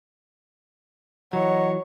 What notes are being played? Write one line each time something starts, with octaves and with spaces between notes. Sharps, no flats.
E3 F#3 C#5 D#5 F#5 A#5